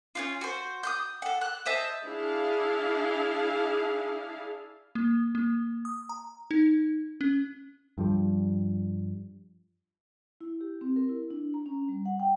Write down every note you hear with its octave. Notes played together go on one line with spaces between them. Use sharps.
C#4 D#4 F4
F#4 C5
D#6 F6 G6
A4 F#5
F#6
C5 D#5 E5 A5
D4 E4 G#4 F5
A#3
A#3
D#6
A#5
D#4
C#4
G2 F3 G3
E4
G4
C4
A#4
E4
D4
A#5
C#4
G3
F#5
G5